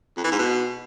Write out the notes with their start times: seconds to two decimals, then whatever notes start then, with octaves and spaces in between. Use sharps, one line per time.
0.17 F2
0.24 E3
0.32 G#2
0.39 B2